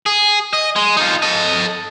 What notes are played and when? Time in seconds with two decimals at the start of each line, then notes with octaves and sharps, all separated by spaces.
0.06 G#4
0.53 D#5
0.76 G#3
0.97 D#4 F4
1.22 A4 D#5